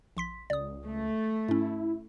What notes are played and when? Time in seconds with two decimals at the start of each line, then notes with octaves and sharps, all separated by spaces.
0.17 A#1 C6 B6
0.50 C#2 D5 D#6
0.86 A3
1.48 G#2 C#4 E4